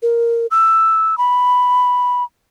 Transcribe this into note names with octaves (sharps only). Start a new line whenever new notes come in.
A#4
E6
B5